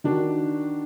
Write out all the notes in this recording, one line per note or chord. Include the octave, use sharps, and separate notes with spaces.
D#3 D4 F#4